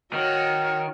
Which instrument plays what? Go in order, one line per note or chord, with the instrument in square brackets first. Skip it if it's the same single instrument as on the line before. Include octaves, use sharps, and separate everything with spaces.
[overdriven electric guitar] D#3 [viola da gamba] F#4 C#5 [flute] F6